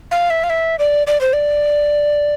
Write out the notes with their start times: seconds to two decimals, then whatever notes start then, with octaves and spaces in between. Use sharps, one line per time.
0.11 F5
0.30 E5
0.44 F5
0.50 E5
0.79 D5
1.07 D5
1.21 C5
1.33 D5